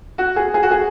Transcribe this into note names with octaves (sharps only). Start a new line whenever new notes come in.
F#4
G#4
G#4
F#4
G#4